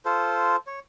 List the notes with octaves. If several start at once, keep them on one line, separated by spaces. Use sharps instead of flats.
F4 A4 C5
C#5